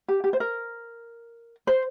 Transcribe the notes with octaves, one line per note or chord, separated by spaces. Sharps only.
G4
G4
C5
A#4
C5